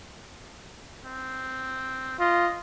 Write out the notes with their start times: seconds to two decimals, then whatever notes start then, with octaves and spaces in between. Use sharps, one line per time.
1.05 C4
2.20 F4 D#5